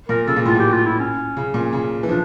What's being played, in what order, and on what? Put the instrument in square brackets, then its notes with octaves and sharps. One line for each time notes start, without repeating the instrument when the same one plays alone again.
[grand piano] A#2 [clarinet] A#4
[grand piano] C#3 [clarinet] A4
[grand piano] A#2
[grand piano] A2 [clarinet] F4
[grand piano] A#2
[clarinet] G4
F4
E4
C#4
[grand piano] C#3
A#2
C#3
E3
[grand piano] F3 [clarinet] D4